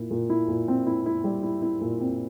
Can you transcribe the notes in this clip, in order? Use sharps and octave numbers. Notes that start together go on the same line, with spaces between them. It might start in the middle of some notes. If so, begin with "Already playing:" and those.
Already playing: A#2 E4
A#2
E4
A#2
C4
E4
E4
G3
E4
E4
A#2
C4